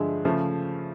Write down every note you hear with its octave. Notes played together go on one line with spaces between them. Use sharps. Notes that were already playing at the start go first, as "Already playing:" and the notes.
Already playing: G2 D3 F3 G#3 E5
C#3 F3 A3